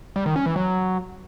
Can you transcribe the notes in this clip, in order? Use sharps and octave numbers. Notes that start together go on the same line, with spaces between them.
G3
D#3
C#4
E3
F#3